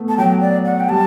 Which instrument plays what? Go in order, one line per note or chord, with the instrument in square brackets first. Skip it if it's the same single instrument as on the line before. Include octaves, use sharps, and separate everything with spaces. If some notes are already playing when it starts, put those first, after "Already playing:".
Already playing: [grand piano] A3 B3
[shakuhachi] A5
[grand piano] F#3 [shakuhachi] G5
[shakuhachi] D5
F#5
G5
[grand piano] G3 [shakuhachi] A5